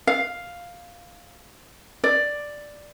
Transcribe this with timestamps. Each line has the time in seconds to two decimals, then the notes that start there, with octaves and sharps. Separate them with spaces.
0.07 F5
2.04 D5